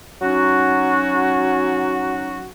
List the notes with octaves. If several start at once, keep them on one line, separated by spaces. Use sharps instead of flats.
F#3 C#4 D#4 F#4